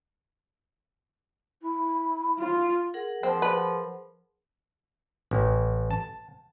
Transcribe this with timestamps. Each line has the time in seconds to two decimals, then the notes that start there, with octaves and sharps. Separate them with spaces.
1.62 E4
2.39 F4
2.94 G#4 A#4 F#5
3.23 F3 C4
3.42 B4
5.31 A1
5.91 A5